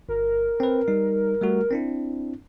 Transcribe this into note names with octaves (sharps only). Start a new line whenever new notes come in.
G1 A#4
C4 B4
G3 D#4
G3 A3 F#4
C4 D4 E4